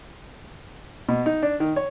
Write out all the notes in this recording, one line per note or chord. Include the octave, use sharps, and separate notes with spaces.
B2
D#4
D4
D#3
C#5